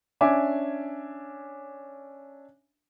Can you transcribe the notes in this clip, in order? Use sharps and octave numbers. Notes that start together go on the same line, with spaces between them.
C#4 D4 E5 G#5 D6